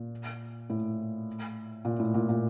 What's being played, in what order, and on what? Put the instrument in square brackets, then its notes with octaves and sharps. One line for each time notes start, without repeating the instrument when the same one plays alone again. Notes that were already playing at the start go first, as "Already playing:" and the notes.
Already playing: [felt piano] A#2
A2
A#2
A2
A#2
A#2